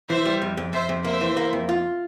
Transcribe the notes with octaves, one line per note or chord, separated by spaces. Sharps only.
E3 C5 E5
G3
F2
F2
F2 C5 E5
F2
A#3 C5 E5
E3
A#3
F2
F4